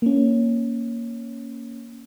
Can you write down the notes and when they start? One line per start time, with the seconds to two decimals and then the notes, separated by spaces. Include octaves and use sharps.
0.02 A#3 C#4